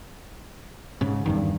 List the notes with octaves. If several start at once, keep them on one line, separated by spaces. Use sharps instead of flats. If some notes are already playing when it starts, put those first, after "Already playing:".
G#2 C#3
E2 G2 D#3